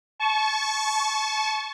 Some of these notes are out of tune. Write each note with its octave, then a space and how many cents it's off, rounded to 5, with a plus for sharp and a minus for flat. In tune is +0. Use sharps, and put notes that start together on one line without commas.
A5 -30 C#6 +0